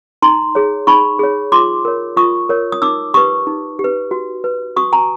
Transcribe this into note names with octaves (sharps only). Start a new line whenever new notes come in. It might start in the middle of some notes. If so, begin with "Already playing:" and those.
D#4 A#5 C6
G#4 C#5
D#4 B5 C#6
G#4 C#5
F4 C6 D6
A#4 C#5
F4 C#6 D#6
A#4 C#5
D#6
D#4 D6 E6
G4 B4 C#6 D#6
D#4
G4
B4
F#4
B4
F#4 C#6 D#6
G#5 A#5